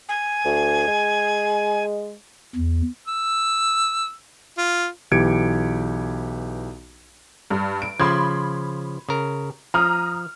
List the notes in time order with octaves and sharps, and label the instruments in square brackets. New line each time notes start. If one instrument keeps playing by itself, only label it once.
[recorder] G#5
[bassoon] D2
G#3
[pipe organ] E2
[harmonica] E6
F4
[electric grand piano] B1 E3 G4 G#6 C#7 D7
[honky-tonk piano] G2
D7
[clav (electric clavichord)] C#3 F3 [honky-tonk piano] B5 C6 G#6
[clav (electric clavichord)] C#3 A#4
[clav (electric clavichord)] F3 [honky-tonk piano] A#5 D#6 F6